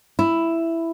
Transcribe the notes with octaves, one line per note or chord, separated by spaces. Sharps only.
E4